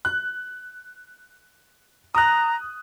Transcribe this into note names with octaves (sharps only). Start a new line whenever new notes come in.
F#6
A#5 D#6 F#6